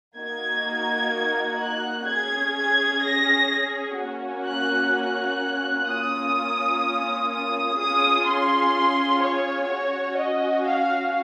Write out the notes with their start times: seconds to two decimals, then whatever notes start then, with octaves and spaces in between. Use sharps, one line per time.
0.17 A#3 D#4 F#4 G#6
1.60 F#6
2.07 C#4 G#4 G#6
2.55 G#6
3.03 A#6
3.98 A#3 C#4 F#4
4.46 F#6
4.94 F#6
5.88 A#3 C#4 F4 D#6
7.31 D#6
7.79 C#4 F4 G#4 D#6
8.26 C6
9.22 C#5
9.69 C#4 F#4
10.17 D#5
10.65 F5